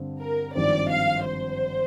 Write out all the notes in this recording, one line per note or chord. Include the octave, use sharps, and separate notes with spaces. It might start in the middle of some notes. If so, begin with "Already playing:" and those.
Already playing: G2 D3 C4
A#4
G#1 G2 F3 C4 D#4 D5
F5
C5